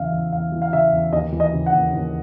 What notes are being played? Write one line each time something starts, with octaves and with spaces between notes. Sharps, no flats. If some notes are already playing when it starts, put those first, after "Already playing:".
Already playing: E2 C#3 E3 E5 F5
E2
E2 F5
E3
F5
C#3 E5
E2
D#2 D#5
E3
D#5
C#3
F#5
D#2
D#2